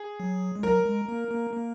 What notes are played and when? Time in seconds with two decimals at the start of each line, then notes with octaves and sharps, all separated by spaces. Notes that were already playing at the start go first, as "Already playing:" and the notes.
Already playing: G#4
0.20 F#3
0.55 G#3
0.63 F#3 A#4
0.86 G#3
1.08 A#3
1.31 A#3
1.53 A#3